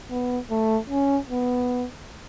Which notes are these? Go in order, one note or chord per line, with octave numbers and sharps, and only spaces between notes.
B3
A3
C#4
B3